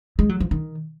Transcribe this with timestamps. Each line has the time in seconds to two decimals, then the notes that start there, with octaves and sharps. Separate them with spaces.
0.19 G#3
0.29 F#3
0.40 F3
0.51 D#3